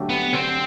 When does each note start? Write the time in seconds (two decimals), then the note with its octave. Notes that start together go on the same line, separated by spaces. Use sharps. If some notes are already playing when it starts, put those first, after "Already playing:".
Already playing: D3 F#3 A3 D4 G4
0.09 B3
0.33 D3 C4